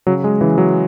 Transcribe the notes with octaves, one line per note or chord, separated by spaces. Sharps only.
C#3 F#3
G#3
C#3 E3
F#3